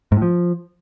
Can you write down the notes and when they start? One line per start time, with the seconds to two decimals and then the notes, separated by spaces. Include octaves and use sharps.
0.12 G#2
0.17 A2
0.22 F3